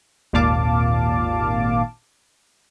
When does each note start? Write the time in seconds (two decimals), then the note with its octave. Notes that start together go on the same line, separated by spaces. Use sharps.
0.33 G#1 D#2 A#2 F5 A5 D6